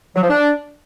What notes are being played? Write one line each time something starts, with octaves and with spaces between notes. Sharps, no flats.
F#3
F3
D4